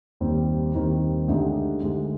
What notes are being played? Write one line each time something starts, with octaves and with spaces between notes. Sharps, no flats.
D#2 D#3 G3 C4
D#2 D#3 G3 C4
D2 D3 G#3 D#4 G4
D2 D3 G#3 D#4 G4